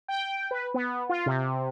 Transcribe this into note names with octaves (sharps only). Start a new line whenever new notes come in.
G5
B4
B3
F4
C3